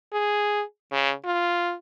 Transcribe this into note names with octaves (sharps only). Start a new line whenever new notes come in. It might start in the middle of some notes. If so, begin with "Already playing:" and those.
G#4
C#3
F4